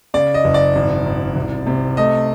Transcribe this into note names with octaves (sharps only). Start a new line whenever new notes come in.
C#3 D5
D#5
F#1
D5
G#1
G#1
C2
C3
A3 D#5